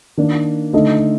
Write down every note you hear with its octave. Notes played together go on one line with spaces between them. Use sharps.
D#3 A#3 D4
D3 A3 D#4 A4 D#5